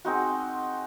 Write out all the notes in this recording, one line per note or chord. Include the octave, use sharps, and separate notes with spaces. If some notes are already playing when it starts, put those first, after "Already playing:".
G#3 C4 D#4 F#4